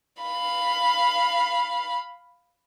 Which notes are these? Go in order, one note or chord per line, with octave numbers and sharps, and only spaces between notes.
F5 B5